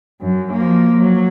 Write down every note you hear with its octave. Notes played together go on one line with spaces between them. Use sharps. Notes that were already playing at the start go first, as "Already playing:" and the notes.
F#2
F3 A#3
F#3